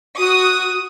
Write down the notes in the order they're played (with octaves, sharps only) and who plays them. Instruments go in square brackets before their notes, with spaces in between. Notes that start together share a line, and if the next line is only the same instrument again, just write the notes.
[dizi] F#4 [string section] D#6